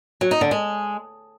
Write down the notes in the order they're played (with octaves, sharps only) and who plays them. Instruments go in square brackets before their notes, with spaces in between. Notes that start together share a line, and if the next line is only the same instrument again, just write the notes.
[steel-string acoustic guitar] F#3
D#4
D3
G#3